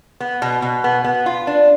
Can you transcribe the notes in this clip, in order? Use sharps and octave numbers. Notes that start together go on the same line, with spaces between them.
B3
B2
B2
B3
B3
F4
D4